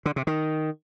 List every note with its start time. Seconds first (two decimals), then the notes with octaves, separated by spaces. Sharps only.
0.06 D3
0.16 C3
0.27 D#3